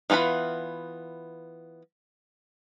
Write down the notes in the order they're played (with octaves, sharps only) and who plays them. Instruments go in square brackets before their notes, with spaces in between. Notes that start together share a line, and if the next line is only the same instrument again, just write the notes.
[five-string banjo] E3 B3 F4 F#5 B5